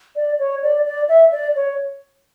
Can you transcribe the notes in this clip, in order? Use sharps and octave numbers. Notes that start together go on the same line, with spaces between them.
D5
C#5
D5
D5
E5
D5
C#5